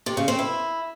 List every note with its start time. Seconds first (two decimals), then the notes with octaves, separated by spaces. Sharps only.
0.06 C3
0.17 C#3
0.28 C4
0.39 E4